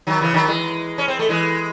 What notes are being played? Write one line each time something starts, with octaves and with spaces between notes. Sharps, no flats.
D#3 F#3
C#3 E3
D#3 F#3
E3 G#3
C#4
C4
A3
E3 G#3